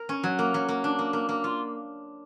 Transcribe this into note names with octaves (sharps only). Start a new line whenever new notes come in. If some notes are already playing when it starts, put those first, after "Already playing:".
Already playing: A#4
C#4
F#3
A#3
F#3
A#3
D4
A#3
A#3
A#3
F4